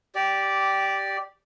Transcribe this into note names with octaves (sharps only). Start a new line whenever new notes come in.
G4 D5